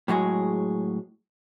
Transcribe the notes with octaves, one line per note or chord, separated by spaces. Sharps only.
A2 F#3 G#3 G#4